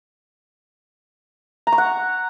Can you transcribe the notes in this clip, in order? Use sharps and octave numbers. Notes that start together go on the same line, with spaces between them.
A#5
C#6
F#5